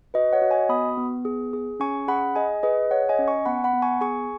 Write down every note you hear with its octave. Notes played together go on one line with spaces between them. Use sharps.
F#4 B4 D#5
C#5 F#5
F#4
D#5 G#5
B3 B5 D#6
B3
G#4
G#4
C#4 G#5 C#6
G#4 F#5 B5
G#4 D#5 G#5
G#4 B4 D#5
G#4 C#5 F#5
D#5 G#5
C#4
G#5 C#6
B3 F#5 B5
F#5 B5
B3
G#5 C#6
G#4 G#5 C#6